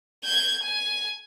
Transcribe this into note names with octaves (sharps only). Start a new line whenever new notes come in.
G6 G#6
G#5